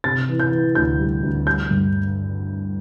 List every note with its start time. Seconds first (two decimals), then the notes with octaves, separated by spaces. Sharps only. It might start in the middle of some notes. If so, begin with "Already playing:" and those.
0.04 C3 A6
0.29 E3
0.40 G6
0.52 E3
0.75 D2 G6
0.99 G3
1.23 D2
1.46 G3 G6
1.71 G2